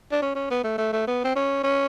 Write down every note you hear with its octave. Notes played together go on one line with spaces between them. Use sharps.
D4
C#4
C#4
B3
A3
A3
A3
B3
C4
C#4
C#4